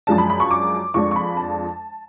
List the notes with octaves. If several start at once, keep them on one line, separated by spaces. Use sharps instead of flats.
F#2 F3 G#3 D4 A5
B5
B5
C#6
D6
F2 F3 G#3 D4 C#6
C#6
B5
A5